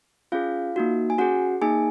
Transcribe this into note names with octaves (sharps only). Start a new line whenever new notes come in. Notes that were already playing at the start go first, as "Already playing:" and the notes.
C#4 F4 G#4 F5
A#3 D#4 F#4
G#5
C#4 F#4 G#4 F#5
A#3 D#4 G#4 G#5